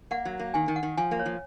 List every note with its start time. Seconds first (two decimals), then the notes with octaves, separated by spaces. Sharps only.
0.11 A#3 F#5
0.25 F#3
0.39 A#3
0.54 D#3 G#5
0.68 D#3
0.76 F#5
0.83 D#3
0.97 F3 G#5
1.11 A#3
1.19 C#5
1.26 F3